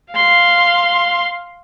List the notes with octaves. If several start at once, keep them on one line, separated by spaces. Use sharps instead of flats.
F5 C6